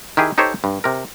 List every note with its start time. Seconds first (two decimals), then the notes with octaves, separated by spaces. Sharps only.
0.17 D#3 E4 G4 G#4
0.38 D#4 G4 A4 C5 C#5
0.64 G2
0.84 C3 A#4